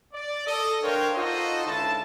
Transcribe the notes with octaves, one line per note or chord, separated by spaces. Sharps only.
D5
A4 D#5
D4 A#4 C5 C#5 F5 G5
D#4 F4 F#4 A4 C5 D#5
C#2 D3 E4 A5